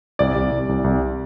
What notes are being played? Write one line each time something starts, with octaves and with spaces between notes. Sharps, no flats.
C2 D5
C2
C2
C2
C2